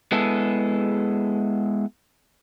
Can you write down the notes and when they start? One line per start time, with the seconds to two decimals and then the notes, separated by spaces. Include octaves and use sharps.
0.12 G#3 B3 E4 G#4 A4